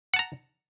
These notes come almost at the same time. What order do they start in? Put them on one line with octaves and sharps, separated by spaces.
F#5 A5 A#5